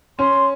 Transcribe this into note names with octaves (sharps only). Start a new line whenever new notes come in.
C#4 C6